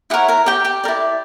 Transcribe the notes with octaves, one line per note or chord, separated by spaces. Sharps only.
E4 G4 A#4 C#5 F#5
A#4 A#5
G4 G5
G4 G5
E4 A#4 D5